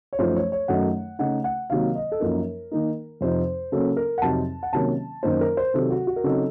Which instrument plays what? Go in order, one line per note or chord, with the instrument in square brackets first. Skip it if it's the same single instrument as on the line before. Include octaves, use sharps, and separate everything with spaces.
[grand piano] C#5
F#2 F3 A3 D#4 C5
C#5
C#5
F#2 D#3 F#3 A3 D#4 F#5
C#3 A3 D#4 F#5
F#5
C3 D#3 F#3 A#3 F5
D#5
A4
F#2 F3 A#3 D#4 A#4
D#3 A#3 D#4
F2 C3 F3 C4 D#4 C5
C#3 F#3 A#3 C#4 A4
A#4
F#5
F2 C3 F#3 C4 D#4 A5
F#5
C3 D#3 F#3 A#3 C#4 A5
F#2 D#3 A#3 D#4 C5
A#4
C5
C3 D#3 F#3 A4
F#4
F#4
A#4
C#3 F#3 C4 D#4 A4